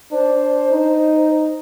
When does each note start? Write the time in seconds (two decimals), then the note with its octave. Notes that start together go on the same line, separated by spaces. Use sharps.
0.12 D4 C5
0.71 D#4